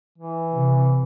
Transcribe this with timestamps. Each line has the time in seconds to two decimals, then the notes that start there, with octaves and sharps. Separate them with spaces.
0.18 E3
0.52 C3